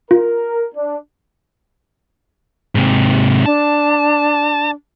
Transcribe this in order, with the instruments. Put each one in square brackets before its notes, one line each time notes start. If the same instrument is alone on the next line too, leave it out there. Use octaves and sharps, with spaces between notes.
[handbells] F4 [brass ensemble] A#4
[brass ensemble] D4
[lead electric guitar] G#2 C3
[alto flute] D4 [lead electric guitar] A5